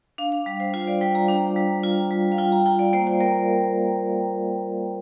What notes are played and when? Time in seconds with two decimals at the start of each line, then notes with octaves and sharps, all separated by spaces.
0.18 D4 F5
0.32 F5
0.46 G3
0.60 C5
0.74 F4 C5
0.87 D5
1.01 G3 G5
1.15 A#5
1.29 D4
1.56 G3
1.83 F4
2.11 G3
2.32 F5
2.38 F4 G5
2.52 A#5
2.66 F4 G5
2.79 D5
2.93 A#3 C5
3.07 C5
3.21 A#3 A#4